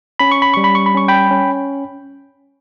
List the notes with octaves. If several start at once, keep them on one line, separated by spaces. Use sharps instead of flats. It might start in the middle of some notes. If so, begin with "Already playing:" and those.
C#4 B5
C#6
B5
G3 C#6
B5
C#6
B5
C#4 C#6
G5 B5
C#4